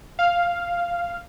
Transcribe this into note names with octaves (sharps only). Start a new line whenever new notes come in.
F5